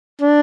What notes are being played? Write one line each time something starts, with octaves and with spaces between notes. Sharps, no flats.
D4